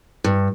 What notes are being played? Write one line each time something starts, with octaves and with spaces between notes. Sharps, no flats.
G2